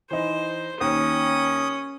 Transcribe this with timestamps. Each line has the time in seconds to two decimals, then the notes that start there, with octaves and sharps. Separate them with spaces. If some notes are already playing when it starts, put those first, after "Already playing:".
0.11 E3 D#4 C5
0.81 D#2 C#4 D#6